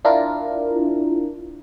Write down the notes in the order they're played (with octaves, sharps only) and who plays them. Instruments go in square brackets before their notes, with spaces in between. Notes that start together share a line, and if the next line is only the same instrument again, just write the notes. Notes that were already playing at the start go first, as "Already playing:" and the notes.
[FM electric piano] D4 E4 F4 A#4